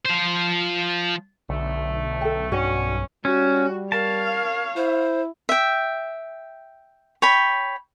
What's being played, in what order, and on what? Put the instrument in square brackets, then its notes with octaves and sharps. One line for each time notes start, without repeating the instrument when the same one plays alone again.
[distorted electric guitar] F3 C5
[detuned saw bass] B1 [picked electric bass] D3 [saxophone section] A3
[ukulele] A4 G5
[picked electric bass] G2 D4 [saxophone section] C#4 [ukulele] F#4 D5 G5
[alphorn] G3 [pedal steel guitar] C#4 [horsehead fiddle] F#4
[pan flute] A#4 [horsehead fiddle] C#5 F5 [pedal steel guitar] A5
[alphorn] E4 [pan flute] C5
[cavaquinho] E5 G5
C#5 G5 B5